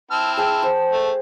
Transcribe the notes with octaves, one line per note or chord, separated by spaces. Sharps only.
C4 E4 A5 F6
G#4 G5 A5
C5
A3